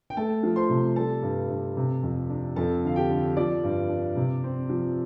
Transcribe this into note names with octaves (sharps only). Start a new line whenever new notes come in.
G5
A3 A4 A5
F3
C5 C6
C3
G3 A4 A5
G2
G2
C3
F2
D4
F2 A4 A5
D3 F5
G4 G5
D3
F3 D5
G2
D4
C3
C4
F3